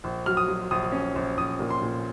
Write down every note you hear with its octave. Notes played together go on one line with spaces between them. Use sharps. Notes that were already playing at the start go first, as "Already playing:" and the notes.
A#1
F#3 F6
D#6
F#3
A#1 D#6
C#4
A#1
A#1 D#6
A#2
C6
A#2